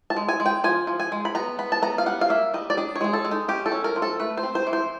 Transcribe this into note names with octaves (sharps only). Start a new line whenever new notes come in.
A5
G#3
G#5
G#3
G5
F3 G#5
F3
G#5
G#3
B5
B3 A#5
B3 B5
A5
B3 A#5
F5
G3 F#5
F5
A#3 E5
G3 D#5
D5
D4 D#5
C#5
G#3 G#4
A4
G#3
D#4
C#4 G4
A4
C#4
A#4
F3
A4
A3 B4
C5
C4
C5
E3
C5